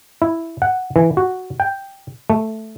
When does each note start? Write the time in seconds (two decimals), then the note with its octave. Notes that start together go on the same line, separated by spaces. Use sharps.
0.22 E4
0.62 F#5
0.96 E3
1.17 F#4
1.60 G5
2.30 A3